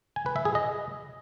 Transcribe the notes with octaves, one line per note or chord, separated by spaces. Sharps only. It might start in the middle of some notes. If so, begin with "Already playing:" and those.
G#5
B4
E5
G#4
D#5